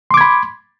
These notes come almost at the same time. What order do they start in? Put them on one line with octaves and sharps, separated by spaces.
C6 D6 G#6 B5